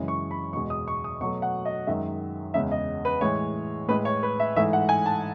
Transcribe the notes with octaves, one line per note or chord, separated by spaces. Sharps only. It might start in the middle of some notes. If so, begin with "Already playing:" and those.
Already playing: F#2 C#3 E3 G#3
C#6
B5
E2 B2 G#3 C#6
D#6
C#6
D#6
B2 F#3 A3 C#6
F#5
D#5
F#2 D#3 G#3 E5
E2 C#3 G#3 E5
D#5
B4
A2 E3 G#3 C#5
A2 G#3 B4
C#5
B4
E5
G#2 E3 A3 E5
F#5
G#5
A5